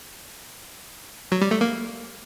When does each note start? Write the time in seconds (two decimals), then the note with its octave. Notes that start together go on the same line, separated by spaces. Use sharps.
1.32 F#3
1.41 G3
1.51 A3
1.61 A#3